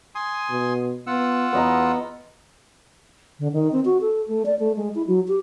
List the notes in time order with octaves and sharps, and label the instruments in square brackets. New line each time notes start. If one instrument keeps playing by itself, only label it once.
[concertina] G#5 C6 D#6
[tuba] B2
[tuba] B3 [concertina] F4 F#5 E6
[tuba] E2 [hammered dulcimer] B3 D#5 A#5
[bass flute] D3
D#3
C4
F#4
A4
A3
D5
A3
G#3
E4
F#3
G4